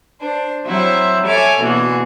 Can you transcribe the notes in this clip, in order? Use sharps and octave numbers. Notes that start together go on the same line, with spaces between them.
D4 C5
F#3 C4 E4 C5 E5
A4 C#5 E5 G#5 D6 F6
B2 D3 E3 A#3 F#4 G#4